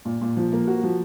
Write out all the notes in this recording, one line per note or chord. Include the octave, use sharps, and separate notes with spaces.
A#2
A#2
F3
A#3
F#4
F3